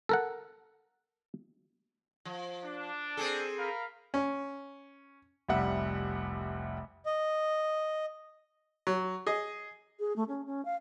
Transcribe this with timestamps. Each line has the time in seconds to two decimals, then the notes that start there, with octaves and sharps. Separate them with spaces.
0.09 A4 A#4 F#5
2.25 F3
2.64 D4
3.17 C4 G#4 A4
3.58 A#4 F5 B5
4.14 C#4
5.49 F1 C2 G3 E5 F#5
7.06 D#5
8.87 F#3
9.27 G#4 D#5
10.00 G#4
10.16 A3
10.28 C#4
10.46 C#4
10.65 F5